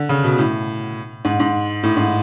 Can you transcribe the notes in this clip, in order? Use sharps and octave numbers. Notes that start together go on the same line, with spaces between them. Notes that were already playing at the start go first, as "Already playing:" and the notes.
Already playing: D3
C#3
B2
A2
G#2
G#2
A2
G#2